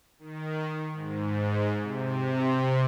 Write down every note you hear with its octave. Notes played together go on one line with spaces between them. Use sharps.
D#3
G#2
C3